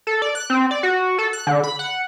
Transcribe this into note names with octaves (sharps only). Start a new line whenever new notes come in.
A4
D5
F#6
C4
D5
F#4
A4
F#6
D3
B5
F#5